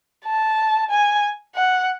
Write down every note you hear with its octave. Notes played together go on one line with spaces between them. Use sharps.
A5
G#5
F#5